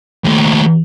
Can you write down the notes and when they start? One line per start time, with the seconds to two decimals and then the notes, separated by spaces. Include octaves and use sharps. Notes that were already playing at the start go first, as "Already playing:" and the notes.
0.25 D#2 A3